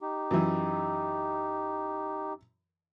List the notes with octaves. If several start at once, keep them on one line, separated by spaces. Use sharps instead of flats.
D#4 G4
F#2 E3